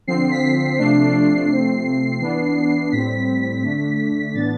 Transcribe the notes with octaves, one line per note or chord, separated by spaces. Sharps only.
D3 F3 C4 C7
B6
B6
C3 F3 A3 D4 C7
C3 F3 A3 C4
E3 B3 D4
A2 G3 C4 B6
D3 A3 D4
A2 E3 B3 D4 A6